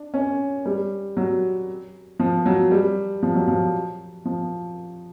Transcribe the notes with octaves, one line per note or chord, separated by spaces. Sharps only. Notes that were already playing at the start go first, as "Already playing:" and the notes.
Already playing: D4
C#4
G3
F#3
F3
F#3
G3
F3
F#3
F3
F3